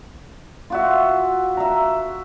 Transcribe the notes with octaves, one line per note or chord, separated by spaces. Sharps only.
F4 F#4 E5
E5 A#5